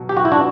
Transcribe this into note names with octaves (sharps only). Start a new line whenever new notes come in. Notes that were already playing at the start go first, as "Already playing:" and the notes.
Already playing: B2 F#3
G4
F#4
E4
D4 F#4